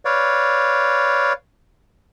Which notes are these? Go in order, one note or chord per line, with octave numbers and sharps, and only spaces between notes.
B4 C#5 D5 F5